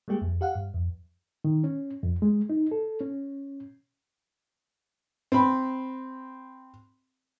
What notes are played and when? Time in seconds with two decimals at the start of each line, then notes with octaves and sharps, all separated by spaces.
0.08 G3 G#3 A#3 G4 G#4
0.21 F2
0.41 G4 F5 F#5
0.55 G2
0.74 F2
1.44 D#3
1.64 C#4
2.03 F2
2.22 G#3
2.50 D#4
2.71 A4
3.00 C#4
5.32 C4 B5